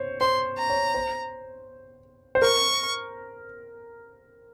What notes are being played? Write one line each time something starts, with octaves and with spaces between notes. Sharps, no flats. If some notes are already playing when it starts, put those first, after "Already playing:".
Already playing: C5 C#5
C5 C6
A#5
C#5
C5
C5
A#4 C#6